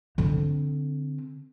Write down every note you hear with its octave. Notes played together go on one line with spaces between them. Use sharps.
D3 C4